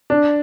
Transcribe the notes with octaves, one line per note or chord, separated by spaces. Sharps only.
D4